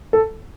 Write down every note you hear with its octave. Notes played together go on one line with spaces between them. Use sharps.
A4